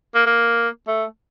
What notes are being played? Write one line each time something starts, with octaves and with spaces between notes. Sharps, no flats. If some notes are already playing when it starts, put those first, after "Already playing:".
A#3
A#3
A3